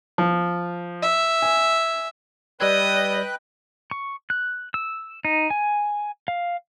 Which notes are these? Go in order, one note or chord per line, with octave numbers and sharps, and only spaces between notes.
F3
E5
G#5
G3 B4 D5 D#5 G5 E6 F#6 G#6
C#6
F#6
E6
D#4
G#5
F5